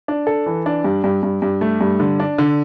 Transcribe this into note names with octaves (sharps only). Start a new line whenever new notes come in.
D4
A4
E3
D4
G2
G2
G2
G2
A3
G2
D3
D4
D3